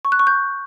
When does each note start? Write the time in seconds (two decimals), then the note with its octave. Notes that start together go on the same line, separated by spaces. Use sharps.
0.05 C#6
0.12 F#6
0.19 C#6
0.27 G6